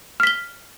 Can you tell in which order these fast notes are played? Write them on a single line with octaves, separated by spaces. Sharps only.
F6 B6 G7